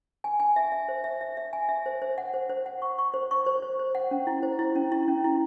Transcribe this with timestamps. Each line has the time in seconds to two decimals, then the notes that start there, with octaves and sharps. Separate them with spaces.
0.24 G#5
0.40 G#5
0.56 E5
0.72 E5
0.89 C5
1.04 E5
1.21 E5
1.37 E5
1.53 G#5
1.69 E5
1.86 C5
2.02 C5
2.18 F#5
2.34 C5
2.49 C5
2.66 F#5
2.82 C#6
2.98 C#6
3.14 C5
3.31 C#6
3.47 C5
3.62 C5
3.79 C5
3.95 F#5
4.11 C#4
4.27 E4
4.43 C5
4.59 E4
4.76 C#4
4.92 E4
5.08 C#4
5.24 E4